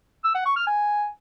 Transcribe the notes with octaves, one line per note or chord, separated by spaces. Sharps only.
E6
F#5
C#6
F6
G#5